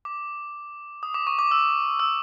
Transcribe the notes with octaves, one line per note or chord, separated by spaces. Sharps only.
D6
D#6
D6
C#6
D6
E6
E6